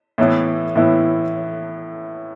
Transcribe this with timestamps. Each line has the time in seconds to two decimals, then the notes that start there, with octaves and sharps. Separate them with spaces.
0.18 A2 E3 B3 E4
0.76 A2 E3 B3 E4